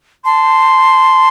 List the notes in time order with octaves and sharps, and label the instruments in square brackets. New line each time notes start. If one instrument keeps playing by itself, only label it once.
[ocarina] A5 [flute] C6